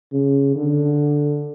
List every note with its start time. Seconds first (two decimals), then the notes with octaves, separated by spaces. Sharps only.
0.12 C#3
0.56 D3